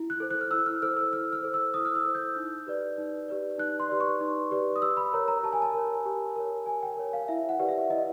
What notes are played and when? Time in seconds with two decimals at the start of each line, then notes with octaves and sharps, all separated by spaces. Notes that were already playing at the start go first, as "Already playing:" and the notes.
Already playing: E4
0.10 F#6
0.20 A4 C5
0.31 F#6
0.41 F6
0.51 E4 E6
0.66 F6
0.82 A4 C5 F6
0.97 E6
1.12 E4 F6
1.33 F6
1.43 A4 C5
1.54 E6
1.74 E4 D#6
1.85 F6
1.95 E6
2.04 A4 C5
2.15 G6
2.36 D#4
2.67 G4 B4 D5
2.98 D#4
3.28 G4 B4 D5
3.58 D#4 F#6
3.80 C6
3.89 G4 B4 D5
4.00 C#6
4.21 D#4
4.51 G4 B4 D5
4.76 D#6
4.82 G4 E6
4.97 B5
5.13 A#4 C#5 A#5
5.28 A#5
5.43 G4 A5
5.53 G#5
5.62 A5
5.74 A#4 C#5
6.06 G4
6.36 A#4 C#5
6.66 G4 G#5
6.83 G5
6.97 A#4 C#5
7.13 F5
7.28 E4 E5
7.49 F#5
7.60 G4 B4 D5
7.69 E5
7.90 E4 D#5